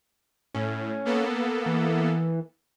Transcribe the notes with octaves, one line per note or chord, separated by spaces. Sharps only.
A2 C#4
A#3 B3 A4
E3